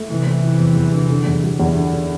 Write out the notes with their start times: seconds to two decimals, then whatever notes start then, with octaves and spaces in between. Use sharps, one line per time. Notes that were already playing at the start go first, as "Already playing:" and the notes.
Already playing: A3
0.10 C3 E3 E4
0.26 A3
0.43 E4
0.60 E2
0.76 E2
0.93 D3
1.10 D3
1.27 E2
1.43 G3
1.60 E2
1.77 D3
1.93 D3